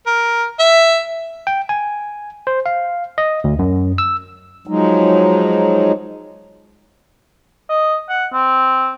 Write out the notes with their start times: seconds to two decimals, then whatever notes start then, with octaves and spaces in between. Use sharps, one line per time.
0.06 A#4
0.59 E5
1.47 G5
1.69 G#5
2.47 C5
2.66 F5
3.18 D#5
3.44 D2
3.59 F#2
3.98 E6
4.67 F3 F#3 G#3 D#4
7.69 D#5
8.09 F#5
8.33 C4